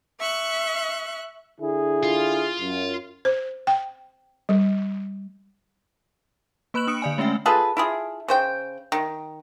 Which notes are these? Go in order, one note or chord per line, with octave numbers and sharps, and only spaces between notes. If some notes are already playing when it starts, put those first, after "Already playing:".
E5 C#6 F#6
D3 E4 G#4
F4
F#2
C5
G5
G3
A#3 B4 B5 F#6 E7 F#7
D4 D#6 C#7 D7
D3 D5 G#5
G#3 A3 C#4 E5 G5
F4 G#4 A4 B4
E4 F4 G#4
C#3 C5 G5
D#3